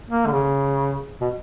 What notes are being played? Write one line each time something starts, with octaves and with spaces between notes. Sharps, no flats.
A#3
D3
C#3
B2